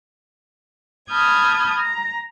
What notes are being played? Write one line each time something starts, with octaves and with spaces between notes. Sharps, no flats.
A5 B5 D#6 F6 G6 G#6
A#5